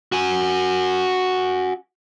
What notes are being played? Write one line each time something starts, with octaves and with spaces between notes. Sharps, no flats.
F#4 G#5